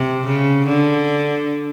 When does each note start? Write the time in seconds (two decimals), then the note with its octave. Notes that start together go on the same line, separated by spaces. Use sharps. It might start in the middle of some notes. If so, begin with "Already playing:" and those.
Already playing: C3
0.26 C#3
0.67 D3